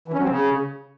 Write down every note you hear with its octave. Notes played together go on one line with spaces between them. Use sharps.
E3
C#4
F#3
C4
C#3